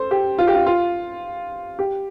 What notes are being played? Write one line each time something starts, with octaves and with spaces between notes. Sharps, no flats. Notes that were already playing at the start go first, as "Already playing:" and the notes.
Already playing: A4 C5
G4
F4
G4
F4
F4
G4